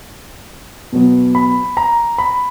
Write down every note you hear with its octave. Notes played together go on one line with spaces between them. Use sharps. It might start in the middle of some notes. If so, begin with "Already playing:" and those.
B2 F#3 B3
B5
A#5
B5